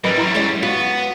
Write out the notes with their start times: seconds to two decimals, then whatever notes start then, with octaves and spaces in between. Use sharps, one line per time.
0.04 F#2 E3 G3 B4 D#5 B5
0.18 F#3 G3 E4 A#5 C6
0.35 G#3 C#4
0.63 B3 F4 F#4 C#6